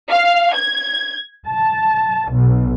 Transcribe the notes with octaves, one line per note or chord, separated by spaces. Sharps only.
F5
G#6
A5
B1